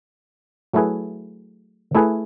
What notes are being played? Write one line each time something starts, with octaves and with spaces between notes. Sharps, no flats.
F#3 A3 E4 G#4 B4
A3 E4 G#4 B4